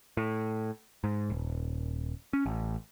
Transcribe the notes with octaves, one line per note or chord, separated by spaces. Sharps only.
A2
G#2
D#1
C#4
A1